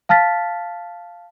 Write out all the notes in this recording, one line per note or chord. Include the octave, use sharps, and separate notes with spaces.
F5 A5 F6 A6 B6